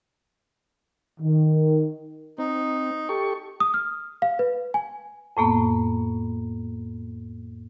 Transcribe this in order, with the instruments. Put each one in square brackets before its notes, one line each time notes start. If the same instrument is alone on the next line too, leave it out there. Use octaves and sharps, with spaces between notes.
[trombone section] D#3
[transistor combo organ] C4 [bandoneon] D#4
[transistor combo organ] G4 A4 C#6
[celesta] D#6
F6
F5
B4
G#5
[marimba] F2 A2 A#3 B3